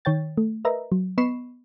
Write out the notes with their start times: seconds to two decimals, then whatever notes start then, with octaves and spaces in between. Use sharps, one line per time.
0.05 D#3 C#5 G5 A6
0.37 A3
0.65 A#4 B4 D#5 E5 A#5
0.92 F#3
1.18 B3 D#5 B5 C#6 C7 E7